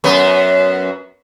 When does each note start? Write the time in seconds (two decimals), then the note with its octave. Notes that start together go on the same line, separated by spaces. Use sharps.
0.04 F#2 B3